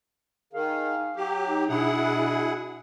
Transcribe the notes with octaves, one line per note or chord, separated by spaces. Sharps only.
D#3 G#4 F5
F#3 G4
D#4
B2 D4 E4 G#4 F#5